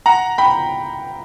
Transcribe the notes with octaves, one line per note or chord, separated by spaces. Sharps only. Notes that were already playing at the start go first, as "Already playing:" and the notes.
F#5 A#5
G5 B5